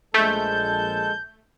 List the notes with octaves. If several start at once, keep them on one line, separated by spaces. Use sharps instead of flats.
A#1 G#3 A3 A4 A5 G6